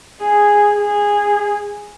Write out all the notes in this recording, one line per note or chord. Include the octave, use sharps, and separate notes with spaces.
G#4
G#4